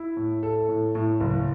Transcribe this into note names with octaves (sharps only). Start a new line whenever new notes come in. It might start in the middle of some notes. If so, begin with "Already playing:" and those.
Already playing: E4
A2
A4
A2
A2
F#1